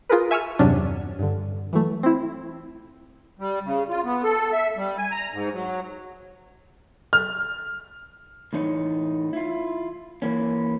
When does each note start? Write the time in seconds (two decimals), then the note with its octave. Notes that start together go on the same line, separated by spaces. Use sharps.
0.10 F4 G#4 A#4 B4
0.31 E5 G#5 C#6 E6 F6
0.59 E2 G2 C3 F#3 C#4 D4
1.19 G2 D3
1.73 E3 F#3 A3
2.03 C4 E4
3.39 G3
3.65 C#3
3.90 F4
4.05 B3
4.23 A4
4.53 E5
4.77 G3
4.98 G#5
5.12 A#5
5.33 G#2
5.53 F#3
7.13 F6
8.53 A2 E3 D#4 C#5
9.33 E4 F4
10.22 E3 A#3 C#4